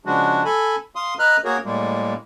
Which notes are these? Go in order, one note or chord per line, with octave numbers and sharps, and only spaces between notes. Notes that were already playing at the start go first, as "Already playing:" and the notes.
C#3 F3 G#3 D4 F#4
A4 G#5 B5
F5 C6 D#6
B4 D#5 A#5 F6 F#6
A#3 F#4 G#4 A#4 C#5
A2 G3 G#3 A#3